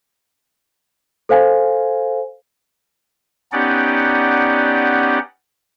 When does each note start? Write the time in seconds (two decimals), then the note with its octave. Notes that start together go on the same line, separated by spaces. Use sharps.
1.29 A4 C5 F5 G#5
3.52 B3 C#4 D#4 G4 D5 F#5